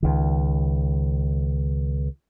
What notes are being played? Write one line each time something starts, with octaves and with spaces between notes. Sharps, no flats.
C#2 D#3